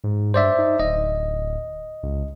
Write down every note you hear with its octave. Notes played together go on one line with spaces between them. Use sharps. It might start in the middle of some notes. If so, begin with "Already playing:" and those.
G#2
G2 C5 D5 E5
D#4
D1 D#5
C#2